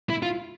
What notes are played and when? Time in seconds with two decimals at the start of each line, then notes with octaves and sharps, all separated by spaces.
0.10 E4
0.23 F4